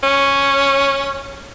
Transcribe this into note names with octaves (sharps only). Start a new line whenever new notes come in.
C#4